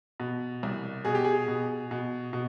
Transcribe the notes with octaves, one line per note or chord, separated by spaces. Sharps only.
B2
C2
B2 G#4
G4
G#4
B2
B2
B2